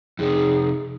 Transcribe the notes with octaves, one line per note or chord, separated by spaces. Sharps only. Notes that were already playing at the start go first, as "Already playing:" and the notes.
F2 C3 D#4 G#4